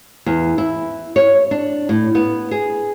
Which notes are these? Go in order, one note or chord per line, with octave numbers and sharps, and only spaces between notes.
E2
E4
C#5
D4
A2
B3
G#4